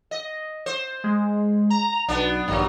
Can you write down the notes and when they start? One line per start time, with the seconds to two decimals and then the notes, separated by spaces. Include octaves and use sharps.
0.11 D#5
0.66 C5
1.04 G#3
1.70 A#5
2.08 B1 B3 D4
2.48 A#1 G2 D3 F#3